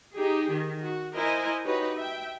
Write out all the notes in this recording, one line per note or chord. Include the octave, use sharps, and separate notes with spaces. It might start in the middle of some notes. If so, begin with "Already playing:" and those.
D#4 G4 G#4
D#3
F#4
E4 A#4 C5 D#5 G#5
D#4 F#4 G4 B4 C#5
E5 G5